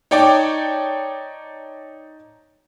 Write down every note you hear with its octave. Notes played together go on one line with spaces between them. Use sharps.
D#4 C#5 D5 G5 A5 D6